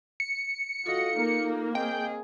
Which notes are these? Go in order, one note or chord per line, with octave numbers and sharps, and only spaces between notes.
C#7
F4 F#4 A4 D#5 F5
A#3 D#4 A#4
C4 G#4 D#5 G5